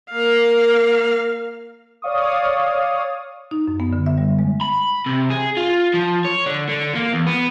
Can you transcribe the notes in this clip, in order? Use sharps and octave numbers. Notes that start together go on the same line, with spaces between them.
A#3 F5
C#5 D5 F5 C#6 D#6
D#4
F#2
B3
D3
E5
G3
G#3
B5
C3
G#4
F4
F3
C#5
D3
D3
A#3
E2
B3